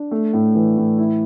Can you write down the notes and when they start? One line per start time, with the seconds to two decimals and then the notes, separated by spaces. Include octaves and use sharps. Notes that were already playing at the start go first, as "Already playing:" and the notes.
Already playing: D4
0.11 A3
0.33 A2
0.55 E3
0.77 A2
0.98 E4